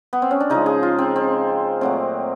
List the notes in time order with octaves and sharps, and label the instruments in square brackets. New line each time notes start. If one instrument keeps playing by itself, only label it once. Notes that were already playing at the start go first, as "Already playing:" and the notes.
[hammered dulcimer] B3
C4
C#4
D4
C#3 F3 G#3 D#4
G#4
F4
C4
C4
A#2 F#3 A3 C4